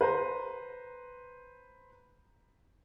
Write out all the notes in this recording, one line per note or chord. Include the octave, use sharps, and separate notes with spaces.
B4 C5 A#5